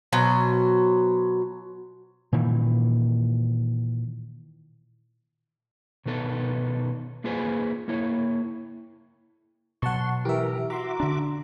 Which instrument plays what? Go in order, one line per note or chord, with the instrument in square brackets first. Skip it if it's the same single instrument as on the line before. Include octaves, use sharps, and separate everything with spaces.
[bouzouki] B2 F#3 C5
[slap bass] A#2 D#3 E3
[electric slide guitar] B2 D#3 B3 A4
A#3 F4 G#4 B4 C5 G#5
A#3 E4 C#5
[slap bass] B2 F#3 [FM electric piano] F#5 A5 C#6 [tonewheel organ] C6
[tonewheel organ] E3 A#4 [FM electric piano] G4 E5
[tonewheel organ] F#4 E5 D6 [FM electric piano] A#5 C6
[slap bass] D3 D4